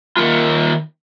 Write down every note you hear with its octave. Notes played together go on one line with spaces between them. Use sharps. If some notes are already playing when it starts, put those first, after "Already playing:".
D#3 A#3 F4